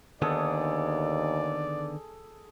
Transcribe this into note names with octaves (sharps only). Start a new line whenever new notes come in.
D#2 D3 D#3 B3 G#4 A4 D5